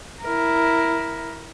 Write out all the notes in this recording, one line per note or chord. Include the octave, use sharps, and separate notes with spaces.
E4 A#4